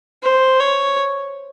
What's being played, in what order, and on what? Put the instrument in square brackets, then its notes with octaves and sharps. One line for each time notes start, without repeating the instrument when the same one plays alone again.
[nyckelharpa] C5
C#5